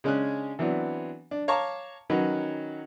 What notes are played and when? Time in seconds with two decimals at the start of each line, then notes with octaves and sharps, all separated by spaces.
0.04 C#3 G#3 C#4 D4 G#5 F#6
0.59 E3 F#3 B3 C4 D4
1.31 D4
1.48 C#5 F5 A5 A#5 C#6 D6
2.10 D#3 F#3 C#4 D#4 B4